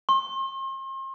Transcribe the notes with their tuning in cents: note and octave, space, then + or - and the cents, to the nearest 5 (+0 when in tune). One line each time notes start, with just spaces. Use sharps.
C6 +40